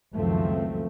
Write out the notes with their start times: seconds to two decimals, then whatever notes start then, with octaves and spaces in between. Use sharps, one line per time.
0.16 C#2 F#2 D#3 F3 A3 C4